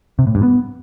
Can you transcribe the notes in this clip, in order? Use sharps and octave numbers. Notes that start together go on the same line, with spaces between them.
C3
A2
G2
B3